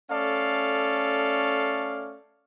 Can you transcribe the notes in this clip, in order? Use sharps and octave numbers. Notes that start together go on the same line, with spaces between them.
A3 C#4 A4 D5 F5